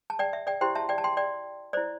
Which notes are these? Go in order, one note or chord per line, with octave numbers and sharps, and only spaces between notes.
A5
D5 G5
E5
D5 G5
E4 G4 C5 G5 C6
E5 A5
D5 G5
A5
G5 C6
D5 G5
E4 C5 D5